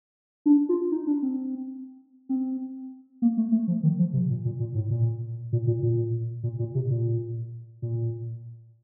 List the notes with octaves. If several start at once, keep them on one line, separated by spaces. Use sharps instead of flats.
D4
F4
D#4
D4
C4
C4
A#3
A3
A3
F3
D#3
F3
C3
A#2
A#2
A#2
A2
A#2
A#2
A#2
A#2
A#2
A#2
C3
A#2
A#2